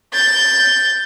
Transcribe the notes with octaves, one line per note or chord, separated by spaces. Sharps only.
G6 A6